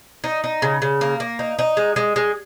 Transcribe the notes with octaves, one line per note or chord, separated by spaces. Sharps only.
D#4
D#4
C#3
C#3
A#3
A#3
D#4
D#4
G#3
G#3
G#3